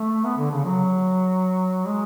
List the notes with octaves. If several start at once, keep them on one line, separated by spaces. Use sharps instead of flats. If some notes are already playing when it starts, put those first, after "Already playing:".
Already playing: A3
B3
D3
C#3
F#3
G#3